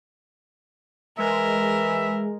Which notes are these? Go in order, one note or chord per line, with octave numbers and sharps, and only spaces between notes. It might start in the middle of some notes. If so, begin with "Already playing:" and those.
E3 G#3 A#4 E5